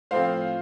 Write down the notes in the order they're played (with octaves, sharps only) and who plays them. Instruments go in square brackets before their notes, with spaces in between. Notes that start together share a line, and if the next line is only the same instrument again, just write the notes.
[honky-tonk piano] A2 F3 C4 C5 F5